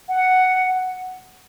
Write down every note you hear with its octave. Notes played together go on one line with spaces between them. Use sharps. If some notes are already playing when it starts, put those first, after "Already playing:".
F#5